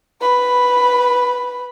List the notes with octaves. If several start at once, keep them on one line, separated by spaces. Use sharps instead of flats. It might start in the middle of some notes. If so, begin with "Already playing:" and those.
B4 B5